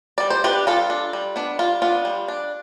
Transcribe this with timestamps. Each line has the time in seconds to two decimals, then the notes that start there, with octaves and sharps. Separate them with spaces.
0.18 G3 D5
0.30 C5
0.44 D4 G4 B4
0.67 G3 F4 A4
0.90 D4
1.13 G3
1.36 B3 D4
1.59 G3 F4
1.82 B3 D4 F4
2.05 G3
2.28 D4